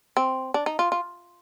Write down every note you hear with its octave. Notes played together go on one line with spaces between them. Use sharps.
C4
D4
D#4
F4
F4